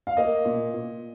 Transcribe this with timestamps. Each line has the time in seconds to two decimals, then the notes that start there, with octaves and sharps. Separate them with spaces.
0.07 F5
0.17 A#3 D#5
0.45 A#2
0.74 A#2